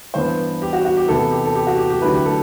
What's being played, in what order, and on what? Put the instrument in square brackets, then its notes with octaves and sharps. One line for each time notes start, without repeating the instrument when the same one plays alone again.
[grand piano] G2 E3 B3 D4 C5
G4
F#4
F#4
G4
C3 E3 B3 E4 A4
G4
A4
G4
F#4
G4
G4
D2 D3 F#3 A3 E4 B4
G4
A4